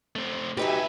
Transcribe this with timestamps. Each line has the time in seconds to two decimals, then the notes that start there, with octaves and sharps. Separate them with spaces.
0.16 A3 C4
0.57 C#2 F#3 D#4 G4 B4 E5 G#5